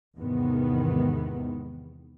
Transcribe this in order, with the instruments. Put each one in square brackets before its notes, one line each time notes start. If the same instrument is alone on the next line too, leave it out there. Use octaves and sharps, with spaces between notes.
[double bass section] E2 G#2 C3 D#3 B3